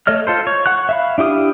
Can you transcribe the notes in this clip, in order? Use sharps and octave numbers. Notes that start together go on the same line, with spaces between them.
A3 C#5 D#5 F6
F4 A4 C5
C#5
F#5 C#6 F#6
E5 F5 B5
D4 E4 G4 D#6 F6